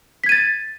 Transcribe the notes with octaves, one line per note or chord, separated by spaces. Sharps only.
G#6 A6 B6 D#7